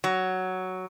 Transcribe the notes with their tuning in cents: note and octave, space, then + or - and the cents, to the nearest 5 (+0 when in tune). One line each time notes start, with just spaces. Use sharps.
F#3 +5